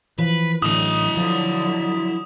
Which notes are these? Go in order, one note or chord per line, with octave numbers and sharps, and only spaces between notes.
E3 F3 B4
A1 D3 F#3 E4 D#5 D#6
D3 F3 F#3